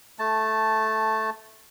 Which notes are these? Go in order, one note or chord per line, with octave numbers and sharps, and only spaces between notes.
A3 A5